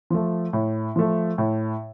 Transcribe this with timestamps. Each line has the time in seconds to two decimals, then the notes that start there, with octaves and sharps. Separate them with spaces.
0.10 F3 A3
0.53 A2
0.96 F3 A3
1.38 A2